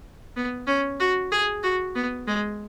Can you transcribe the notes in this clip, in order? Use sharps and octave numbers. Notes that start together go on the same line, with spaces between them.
B3
C#4
F#4
G#4
F#4
B3
G#3